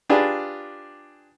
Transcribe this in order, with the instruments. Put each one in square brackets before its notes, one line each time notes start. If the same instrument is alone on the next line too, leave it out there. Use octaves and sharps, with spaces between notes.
[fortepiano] D4 F4 G4 G#4 B4 D5